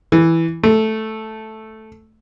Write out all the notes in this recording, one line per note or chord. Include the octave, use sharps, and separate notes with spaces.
E3
A3